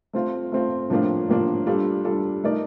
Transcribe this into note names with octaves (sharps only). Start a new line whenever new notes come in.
A3 C4 F4
A3 C4 F4
A2 F3 A#3 D4 F4
A2 F3 A#3 D4 F4
G3 D4 F4 A4
G3 D4 F4 A4
A3 D#4 A#4 D5